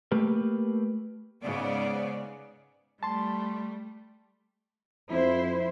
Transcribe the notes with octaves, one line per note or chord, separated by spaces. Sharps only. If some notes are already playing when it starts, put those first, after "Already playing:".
A3 A#3 G4 B4
G#2 C#3 B3 D5
G3 A3 A5 C6
F2 E4 C5